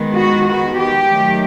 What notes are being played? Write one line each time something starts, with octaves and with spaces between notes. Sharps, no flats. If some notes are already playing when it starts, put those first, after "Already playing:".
Already playing: D#3 G#3 B3
F#4
F#4
G4
D#3 F#3 A3